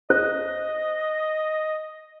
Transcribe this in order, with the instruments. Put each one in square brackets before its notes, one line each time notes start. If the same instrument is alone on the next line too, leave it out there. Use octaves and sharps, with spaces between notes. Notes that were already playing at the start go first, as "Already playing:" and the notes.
[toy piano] C5 [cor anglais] D#5